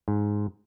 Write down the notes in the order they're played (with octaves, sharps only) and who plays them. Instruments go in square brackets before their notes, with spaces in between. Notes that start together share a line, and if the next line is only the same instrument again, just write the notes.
[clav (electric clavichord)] G#2